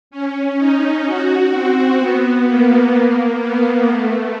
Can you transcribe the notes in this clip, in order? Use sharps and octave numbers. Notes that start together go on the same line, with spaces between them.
C#4
D#4
F#4
C4
B3
A#3
B3
A3